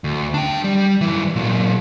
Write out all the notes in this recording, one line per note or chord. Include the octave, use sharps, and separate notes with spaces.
D2
D4 G5
G3
F#2 E3
A#2 F#3